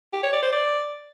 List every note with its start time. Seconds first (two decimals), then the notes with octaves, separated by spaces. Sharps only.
0.13 G4
0.23 C#5
0.33 D5
0.42 C5
0.52 D5